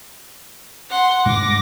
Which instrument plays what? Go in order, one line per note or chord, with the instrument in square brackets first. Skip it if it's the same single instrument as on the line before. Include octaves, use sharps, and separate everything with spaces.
[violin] F#5 C6
[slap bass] G2 G#3 D4 [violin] D6 A#6